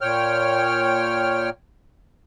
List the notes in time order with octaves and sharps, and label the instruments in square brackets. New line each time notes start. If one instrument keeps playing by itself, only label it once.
[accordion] A#2 C#5 G5 F6